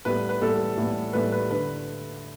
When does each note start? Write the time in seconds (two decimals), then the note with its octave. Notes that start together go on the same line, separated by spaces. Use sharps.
0.05 A2 G3 B3 B4
0.29 B4
0.41 A2 G3 B3 A4
0.77 A2 G3 B3
1.13 A2 G3 B3 B4
1.32 B4
1.51 D3 B4